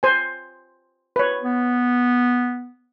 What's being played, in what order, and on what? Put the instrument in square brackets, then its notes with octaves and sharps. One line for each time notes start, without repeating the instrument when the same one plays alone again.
[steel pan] C5 G#5
B4 C#5
[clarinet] B3